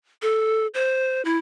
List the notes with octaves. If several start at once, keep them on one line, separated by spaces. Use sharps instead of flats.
A4
C5
E4